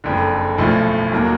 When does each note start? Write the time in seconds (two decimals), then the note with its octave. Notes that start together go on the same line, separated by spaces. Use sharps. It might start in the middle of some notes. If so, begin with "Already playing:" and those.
0.04 F#1 F2 D3
0.58 B1 A2 F3 A3
1.12 D#2 D#3 F#3 A#3